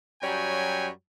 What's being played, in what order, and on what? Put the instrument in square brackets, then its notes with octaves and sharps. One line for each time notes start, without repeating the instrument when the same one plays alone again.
[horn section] F#2 F#3 G3 C#5 G5 G#5